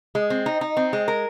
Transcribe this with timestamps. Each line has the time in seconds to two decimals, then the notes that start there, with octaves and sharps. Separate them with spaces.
0.15 G#3
0.30 C4
0.46 D#4
0.61 D#4
0.77 C4
0.93 G#3
1.08 A#4